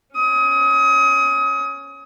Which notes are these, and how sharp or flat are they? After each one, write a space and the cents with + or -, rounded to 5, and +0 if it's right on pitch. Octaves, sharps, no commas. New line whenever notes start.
C#4 +0 D#6 +30